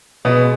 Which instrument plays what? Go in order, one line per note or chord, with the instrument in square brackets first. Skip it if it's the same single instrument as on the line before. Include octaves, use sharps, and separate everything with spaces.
[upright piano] B2 B3 [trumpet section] G#3 C#4 G#4